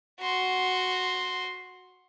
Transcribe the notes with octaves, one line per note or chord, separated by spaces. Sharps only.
F#4 C6